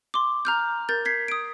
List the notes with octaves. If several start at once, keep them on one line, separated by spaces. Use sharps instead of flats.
C6 D6
A#5 F6 G6
A#4 G6 A6
G#6 B6 C7
D#6 D7